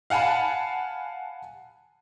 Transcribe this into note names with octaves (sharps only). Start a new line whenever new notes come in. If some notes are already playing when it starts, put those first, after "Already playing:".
F5 F#5 G#5 A5 B5